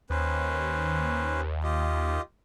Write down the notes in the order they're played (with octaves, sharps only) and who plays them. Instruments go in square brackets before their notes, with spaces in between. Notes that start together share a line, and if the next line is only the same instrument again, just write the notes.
[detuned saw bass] D#2 [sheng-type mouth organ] C#4 B4 C5
[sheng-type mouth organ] F4 G4 D#5